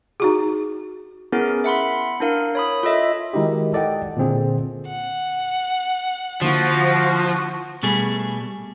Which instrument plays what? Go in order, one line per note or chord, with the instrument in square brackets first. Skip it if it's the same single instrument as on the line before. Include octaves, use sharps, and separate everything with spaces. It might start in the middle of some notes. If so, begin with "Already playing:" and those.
[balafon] D#4 F#4 G#4
[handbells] B3 C#4 E4 G#4 A#4
E5 F#5 B5 C6
D4 E4 A#4 F5
C#5 B5 D#6
F4 A4 D#5 E5
[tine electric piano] D#3 G#3 D#4 E4 F#4 G4
A4 D5 D#5 F#5 G5
A#2 D3 C4 G#4
[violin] F#5
[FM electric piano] D3 A#3 E4 [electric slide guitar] F3 [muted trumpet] F#4
[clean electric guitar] B2 G3 A3 G#4